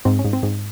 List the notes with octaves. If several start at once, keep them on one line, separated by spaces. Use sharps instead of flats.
G#2 C4
C#4
G#2
C4
G#2